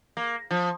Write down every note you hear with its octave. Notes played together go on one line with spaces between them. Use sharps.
A#3
F3